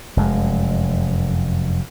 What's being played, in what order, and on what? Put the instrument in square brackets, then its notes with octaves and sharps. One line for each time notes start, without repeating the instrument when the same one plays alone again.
[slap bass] F1 F#2 G#3